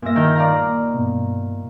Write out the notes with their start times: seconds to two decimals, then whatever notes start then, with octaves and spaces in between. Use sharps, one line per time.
0.02 G2 A#2 A#3 E5 A#6
0.16 D#3 G6
0.35 D5 F5 A#5
0.94 G2 B2